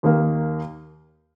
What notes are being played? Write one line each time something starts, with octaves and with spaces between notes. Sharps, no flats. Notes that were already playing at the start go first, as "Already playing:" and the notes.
D#2 D#3 A#3